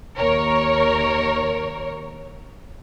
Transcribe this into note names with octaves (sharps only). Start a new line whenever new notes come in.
D#2 A#4 C#5